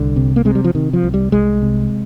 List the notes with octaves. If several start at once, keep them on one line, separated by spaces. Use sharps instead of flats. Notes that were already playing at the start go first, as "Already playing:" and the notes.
Already playing: C2 D3
C3
A#3
C3 G#3
G3
F3
C3 D#3
F3
C2
G3
C2 G#3
C3